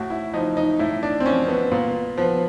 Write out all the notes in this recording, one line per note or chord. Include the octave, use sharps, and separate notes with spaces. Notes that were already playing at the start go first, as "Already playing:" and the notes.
Already playing: A2 F#4
E4
F3 D#4
D#4
A2 E4
D4
C4
F3 C#4
B3
A#2 B3
F3 B3